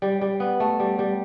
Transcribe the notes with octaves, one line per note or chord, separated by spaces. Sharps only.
G3
G3
B3
A3
G3
G3